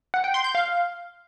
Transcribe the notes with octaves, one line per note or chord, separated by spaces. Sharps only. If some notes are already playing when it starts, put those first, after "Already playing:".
F#5
G5
C6
G6
F5